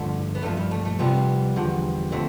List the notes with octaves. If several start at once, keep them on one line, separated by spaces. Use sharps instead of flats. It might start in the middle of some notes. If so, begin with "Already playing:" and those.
Already playing: G2 D3 F3 A3
B3
G2 F3 A3
G3
A3
A3
C2 C3 F3 G3 B3
E2 D3 F3
D3 F3 A3 C4